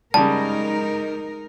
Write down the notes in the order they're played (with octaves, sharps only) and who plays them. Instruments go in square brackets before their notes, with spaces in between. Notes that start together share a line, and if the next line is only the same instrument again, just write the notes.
[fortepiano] C#3 G3 [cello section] G#3 D#4 A#4 [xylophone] A5